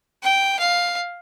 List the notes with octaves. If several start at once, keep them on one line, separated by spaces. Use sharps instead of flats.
G5
F5